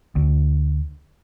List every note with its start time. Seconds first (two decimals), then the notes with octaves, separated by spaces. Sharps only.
0.16 D2